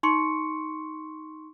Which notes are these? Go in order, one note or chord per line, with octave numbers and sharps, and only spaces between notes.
D#4 C6 C#6 C#7